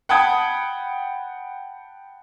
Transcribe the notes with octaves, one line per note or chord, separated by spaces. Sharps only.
F#5 G5 A5 B5 D#6 G#6